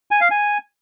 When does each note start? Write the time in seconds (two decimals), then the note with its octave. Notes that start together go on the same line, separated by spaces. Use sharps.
0.11 G#5
0.21 F5
0.31 G#5